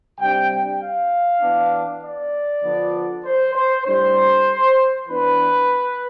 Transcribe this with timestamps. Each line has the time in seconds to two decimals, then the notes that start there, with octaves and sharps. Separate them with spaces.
0.20 C3 G3 D4 G5
0.50 G5
0.81 F5
1.42 E3 B3 D4
2.03 D5
2.64 D3 F3 B3 D4
3.25 C5
3.55 C5
3.86 A2 G3 D4 C5
5.08 E3 B3 D4 B4